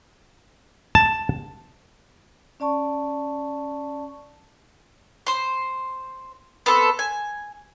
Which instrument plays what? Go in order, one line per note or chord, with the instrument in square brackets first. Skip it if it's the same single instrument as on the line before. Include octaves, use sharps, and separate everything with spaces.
[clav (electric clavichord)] A5
[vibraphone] C#4 D5 A5 C#6
[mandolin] C5 C6
B3 C4 A4
G#5